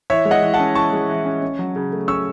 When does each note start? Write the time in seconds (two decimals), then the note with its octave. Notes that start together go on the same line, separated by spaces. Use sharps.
0.10 E3 C#5 E5
0.25 G#3
0.31 D#5 F#5
0.42 E3
0.54 F#5 A5
0.59 C#4
0.75 E3 A5 C#6
0.93 G#3
1.09 E3
1.25 C#4
1.42 C#4
1.59 F#3
1.76 C#3
1.92 A3
2.08 C#4 C#6 E6